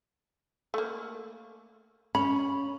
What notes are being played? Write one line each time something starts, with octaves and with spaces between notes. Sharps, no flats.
A3 A#3
C#4 B5